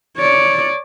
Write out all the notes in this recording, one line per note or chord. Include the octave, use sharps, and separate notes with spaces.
C#5 D5